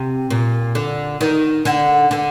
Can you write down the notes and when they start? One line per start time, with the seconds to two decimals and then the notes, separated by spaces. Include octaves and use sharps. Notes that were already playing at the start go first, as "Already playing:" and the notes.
Already playing: C3
0.30 A#2
0.75 D3
1.21 D#3
1.65 D3
2.11 D3